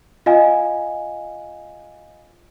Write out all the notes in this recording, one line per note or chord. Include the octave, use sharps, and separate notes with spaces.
F4 D#5 F5 G#5